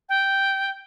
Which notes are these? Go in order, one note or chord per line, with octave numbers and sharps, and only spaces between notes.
G5